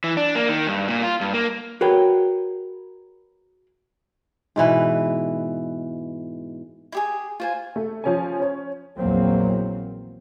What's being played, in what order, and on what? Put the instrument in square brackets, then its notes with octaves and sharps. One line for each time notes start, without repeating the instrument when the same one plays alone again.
[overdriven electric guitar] E3
D4
A#3
D#3
G2
A#2
F4
G2
A#3
[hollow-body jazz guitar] F#4 G#4 A#4 B4 C#5 G5
[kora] G#2 B2 E3 B4
[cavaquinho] E4 G4 G#4
F4 C5 G#5
[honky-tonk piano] A3
F3 C#4 G#5
C#4 C#5
[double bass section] A#1 E2 F#3 A#3 C4